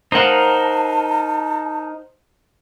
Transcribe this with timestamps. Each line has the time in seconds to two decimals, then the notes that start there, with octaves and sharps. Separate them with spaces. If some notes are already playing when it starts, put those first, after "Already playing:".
0.12 D#4 A#4 C5 F5 F#5 A5